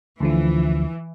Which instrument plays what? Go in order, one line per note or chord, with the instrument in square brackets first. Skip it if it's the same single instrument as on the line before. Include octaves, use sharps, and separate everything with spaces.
[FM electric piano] D2 D3 F3 [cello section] E3